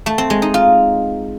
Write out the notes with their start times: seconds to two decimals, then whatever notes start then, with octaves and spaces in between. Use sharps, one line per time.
0.06 A3
0.18 C4
0.30 G#3
0.42 D#4
0.54 F4